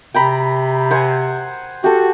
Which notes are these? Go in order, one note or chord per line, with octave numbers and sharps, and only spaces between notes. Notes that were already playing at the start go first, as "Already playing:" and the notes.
C3 G5 A#5 B5
C5 F#5 G#5
F#4 G4 A4